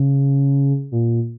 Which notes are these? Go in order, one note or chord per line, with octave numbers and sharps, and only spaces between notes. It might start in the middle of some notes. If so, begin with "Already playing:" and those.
Already playing: C#3
A#2